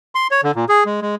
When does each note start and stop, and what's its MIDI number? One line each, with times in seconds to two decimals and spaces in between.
0.15 0.27 84
0.31 0.41 73
0.44 0.52 50
0.56 0.65 46
0.69 0.84 68
0.86 1.01 56
1.02 1.15 56